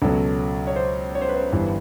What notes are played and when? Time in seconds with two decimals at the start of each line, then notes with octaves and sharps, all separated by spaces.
0.02 C#2 B2 F#3 A4
0.67 C#5
0.76 C5
1.15 C#5
1.21 C5
1.29 B4
1.36 C5
1.52 G1 G2 E3